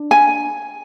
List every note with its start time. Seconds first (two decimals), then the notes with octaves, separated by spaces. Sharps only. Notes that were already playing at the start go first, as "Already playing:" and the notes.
Already playing: D4
0.11 G#5